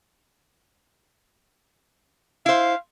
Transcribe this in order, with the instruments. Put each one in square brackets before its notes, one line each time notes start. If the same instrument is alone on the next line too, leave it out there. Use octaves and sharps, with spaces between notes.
[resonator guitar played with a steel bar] E4 C5 [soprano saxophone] F5